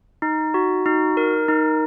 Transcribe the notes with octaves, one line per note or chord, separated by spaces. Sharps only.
D#4
F#4
D#4
A#4
D#4